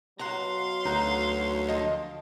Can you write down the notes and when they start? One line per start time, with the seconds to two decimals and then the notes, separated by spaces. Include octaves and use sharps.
0.19 B2 F#3 F#4 F5 F#5 A#5 C6
0.85 D2 D#4 F#4
1.69 F3 D#5